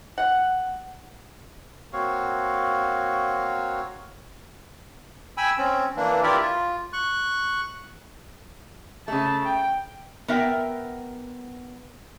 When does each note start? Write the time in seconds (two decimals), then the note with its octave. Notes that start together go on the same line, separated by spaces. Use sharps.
0.18 F#5
1.93 A#3 C4 F#4 C#5 F5
5.37 G5 G#5 B5 E6
5.57 C4 C#4
5.96 E3 A#3 D4
6.23 E4 F4 G4 A#4 D5 E5
6.40 F4
6.93 C#6 F#6
9.08 C#3 A3 A5
9.45 G5
10.28 B3 A#4 E5 G5